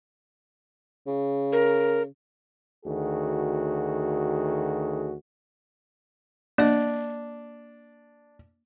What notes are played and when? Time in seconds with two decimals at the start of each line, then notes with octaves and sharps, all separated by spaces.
1.07 C#3
1.52 A#4
2.86 D2 D#3 F#4 G#4
6.58 A#3 D4 D#5